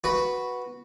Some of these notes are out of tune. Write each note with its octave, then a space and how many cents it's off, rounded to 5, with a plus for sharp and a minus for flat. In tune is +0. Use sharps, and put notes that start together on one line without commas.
F#4 +0 B4 -5